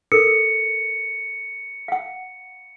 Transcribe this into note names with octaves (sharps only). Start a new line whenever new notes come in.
A4 A#4 C#7
F5 F#5